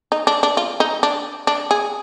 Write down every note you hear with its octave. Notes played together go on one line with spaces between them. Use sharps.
D#4
D4
D4
F4
D#4
D4
D4
G#4